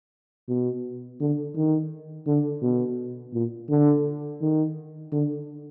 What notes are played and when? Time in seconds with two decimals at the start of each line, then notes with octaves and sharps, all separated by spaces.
0.49 B2
1.20 D3
1.56 D#3
2.27 D3
2.63 B2
3.34 A#2
3.70 D3
4.42 D#3
5.13 D3